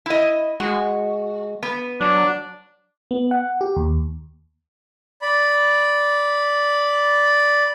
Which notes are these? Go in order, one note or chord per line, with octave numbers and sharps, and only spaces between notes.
E4 D#5
G#3 F#4
B3
F#3 D4
B3
F#5
G4
D#2
D5 B5